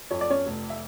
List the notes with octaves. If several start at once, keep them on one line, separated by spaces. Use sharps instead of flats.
F2 C#5
D5
C#4 C#5
F1
E5